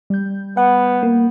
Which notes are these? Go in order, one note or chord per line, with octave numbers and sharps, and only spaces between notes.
G3 G6
B3 F#5
A#3